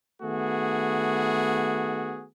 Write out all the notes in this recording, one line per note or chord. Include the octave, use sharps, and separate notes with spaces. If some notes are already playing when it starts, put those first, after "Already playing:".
D#3 A3 B3 F#4 G#4